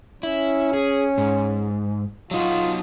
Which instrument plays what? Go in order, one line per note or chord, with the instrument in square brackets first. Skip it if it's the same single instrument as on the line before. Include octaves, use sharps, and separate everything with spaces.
[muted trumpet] C#4 [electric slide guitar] E4
[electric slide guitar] G#4
G#2
[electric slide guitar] F#3 D#4 F#4 [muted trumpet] F4